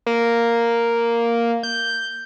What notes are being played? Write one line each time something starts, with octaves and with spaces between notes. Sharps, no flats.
A#3
G6